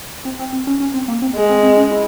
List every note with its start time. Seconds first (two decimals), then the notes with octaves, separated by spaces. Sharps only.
0.25 C4
0.39 C4
0.53 C4
0.67 C#4
0.80 C#4
0.94 C4
1.08 A#3
1.22 C4
1.36 G#3
1.49 C4
1.63 C4
1.77 C#4
1.91 E4